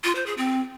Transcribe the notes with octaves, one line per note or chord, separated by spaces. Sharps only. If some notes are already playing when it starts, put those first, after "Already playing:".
F4
C5
G#4
C4